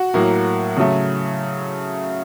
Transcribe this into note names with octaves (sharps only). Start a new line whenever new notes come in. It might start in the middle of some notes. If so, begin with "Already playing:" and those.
Already playing: F#4
A2 F#3 A#3
C#3 F#3 A3